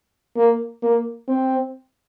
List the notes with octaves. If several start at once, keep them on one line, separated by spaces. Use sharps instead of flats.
A#3
A#3
C4